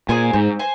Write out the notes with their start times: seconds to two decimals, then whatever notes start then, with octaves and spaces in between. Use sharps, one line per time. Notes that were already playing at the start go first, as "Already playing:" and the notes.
0.09 A#2 G#4 C5 G#5
0.33 G#2 C4
0.59 C5 G#5